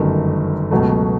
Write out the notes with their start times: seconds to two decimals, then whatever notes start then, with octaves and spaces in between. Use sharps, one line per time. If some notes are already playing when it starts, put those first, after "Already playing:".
Already playing: G1 F#2 D#3 F#3 A3
0.71 C#2 B2 F#3 A3